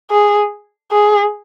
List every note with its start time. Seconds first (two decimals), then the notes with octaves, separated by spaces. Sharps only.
0.11 G#4
0.92 G#4